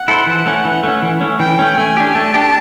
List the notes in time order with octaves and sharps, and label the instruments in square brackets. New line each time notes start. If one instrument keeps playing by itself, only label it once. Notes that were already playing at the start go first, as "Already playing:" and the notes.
Already playing: [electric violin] F#5
[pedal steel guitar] E4 A4 C5
E3
A3 C#4
E3
A3 C#4
E3
A3 C#4
[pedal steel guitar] E3 [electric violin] G5
[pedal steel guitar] A3 C#4
[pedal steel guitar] A3 [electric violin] G#5
[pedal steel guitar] D4 G4
[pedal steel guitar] A3 [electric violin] A5
[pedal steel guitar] D4 G4